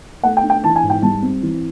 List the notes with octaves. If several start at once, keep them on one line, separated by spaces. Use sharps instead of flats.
A3 F#5
G5
D4
G5
E3 A5
G#5
G#2
G5
G3 A5
C4
E3